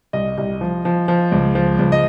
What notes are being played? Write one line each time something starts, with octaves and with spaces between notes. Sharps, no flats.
C2 D#5
C2
F3
F3
F3
C#2
F3
C#2
D#5